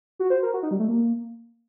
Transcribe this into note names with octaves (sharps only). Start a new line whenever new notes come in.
F#4
C5
A#4
F#4
D#4
G3
A3
A#3